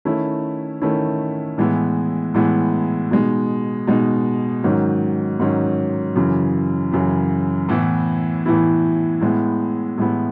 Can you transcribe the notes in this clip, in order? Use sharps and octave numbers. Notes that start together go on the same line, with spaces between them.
D#3 A3 C#4 E4
D#3 A3 C#4 E4
A2 E3 G#3 B3 E4
A2 E3 G#3 B3 E4
B2 G#3 D#4
B2 G#3 D#4
G#2 D#3 F#3 C#4
G#2 D#3 F#3 C#4
F#2 C#3 E3
F#2 C#3 E3
A2 E3 B3 E4
A2 E3 B3 E4
A2 G#3 B3 E4
A2 G#3 B3 E4